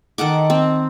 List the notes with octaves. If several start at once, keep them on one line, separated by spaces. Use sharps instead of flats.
D#3 A4 F#5 D6
C4